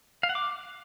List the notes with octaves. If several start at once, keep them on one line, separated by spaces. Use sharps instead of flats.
F5
F#5
D6